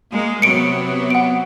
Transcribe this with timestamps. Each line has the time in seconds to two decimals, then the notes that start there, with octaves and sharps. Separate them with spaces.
0.12 G#3 A#3
0.42 C3 F#3 B3 C#7 D7
1.10 F#5 D7